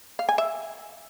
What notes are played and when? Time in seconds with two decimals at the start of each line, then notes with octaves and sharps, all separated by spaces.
0.19 F5
0.29 G#5
0.38 E5